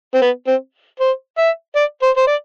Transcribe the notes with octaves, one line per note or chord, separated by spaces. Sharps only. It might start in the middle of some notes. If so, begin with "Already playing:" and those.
C4
B3
C4
C5
E5
D5
C5
C5
D5